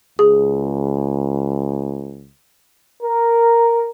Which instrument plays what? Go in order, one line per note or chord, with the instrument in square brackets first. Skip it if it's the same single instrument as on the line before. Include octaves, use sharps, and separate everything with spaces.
[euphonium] C#2 [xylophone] G#4
[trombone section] A#4